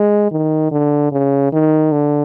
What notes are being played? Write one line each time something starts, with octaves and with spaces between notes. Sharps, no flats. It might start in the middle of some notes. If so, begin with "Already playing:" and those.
Already playing: G#3
D#3
D3
C#3
D#3
D3